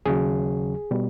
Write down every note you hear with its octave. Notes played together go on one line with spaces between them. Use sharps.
D#2 C#3 F#3 G#4
B2 G3